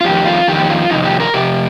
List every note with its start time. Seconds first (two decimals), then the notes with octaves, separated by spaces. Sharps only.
0.01 F4
0.05 F2 D#3 G4
0.26 F4
0.48 F2 D#3 G4
0.69 F4
0.91 F2 C3 D#3 D#4
1.05 G4
1.20 A#4
1.34 F2 C3 G4